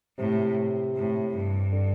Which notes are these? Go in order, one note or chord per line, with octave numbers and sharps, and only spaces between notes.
A2 C3
A2
G2
D3